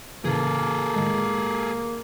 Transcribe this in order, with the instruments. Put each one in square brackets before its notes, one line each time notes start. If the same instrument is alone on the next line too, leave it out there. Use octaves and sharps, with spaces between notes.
[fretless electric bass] A2 C#3 E3 [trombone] A#3 [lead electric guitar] G#4 A4
[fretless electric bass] A2 D#3 G#3